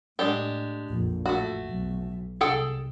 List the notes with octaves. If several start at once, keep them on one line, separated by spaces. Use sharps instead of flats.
A2 G#3 D4 G4
A#1 F2
A1 A3 F#4
B1
C2 G#4 A4 G5